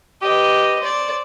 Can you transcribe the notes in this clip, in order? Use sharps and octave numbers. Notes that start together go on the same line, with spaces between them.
G4 B4 D#5
C5 D5